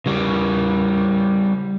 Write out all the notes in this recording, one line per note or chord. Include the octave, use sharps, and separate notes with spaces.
C#3 G3